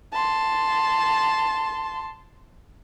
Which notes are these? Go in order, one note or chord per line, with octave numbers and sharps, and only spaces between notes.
A5 C6